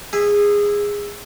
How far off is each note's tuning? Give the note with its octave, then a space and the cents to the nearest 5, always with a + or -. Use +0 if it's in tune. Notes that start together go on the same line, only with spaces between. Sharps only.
G#4 -15 E5 +0